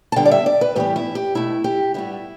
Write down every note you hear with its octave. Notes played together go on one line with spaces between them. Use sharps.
A5
D3 G3 B3 G5
D5
E5
D5
B4
A2 E3 G3 B3 G4
E4
G4
B2 A3 E4
G4
A2 G3 B3 E4